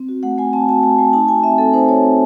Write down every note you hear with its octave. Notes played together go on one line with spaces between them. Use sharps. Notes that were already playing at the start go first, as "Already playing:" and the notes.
Already playing: C4
F#4
A3 F#5
A3 G#5
C4 A5
F#4 A5
A3 A5
A3 G#5
D#4 A5
F#4 G#5
C4 E5
C4 A4
D#4 C5
F#4 C#5
C4